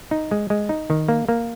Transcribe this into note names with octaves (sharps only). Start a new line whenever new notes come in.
D#4
G#3
G#3
D#4
D#3
A#3
A#3